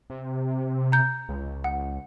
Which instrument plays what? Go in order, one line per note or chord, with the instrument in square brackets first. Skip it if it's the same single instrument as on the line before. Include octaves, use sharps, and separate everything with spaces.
[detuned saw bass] C3
[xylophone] A#5 G6
[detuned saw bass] C#2
[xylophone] F#5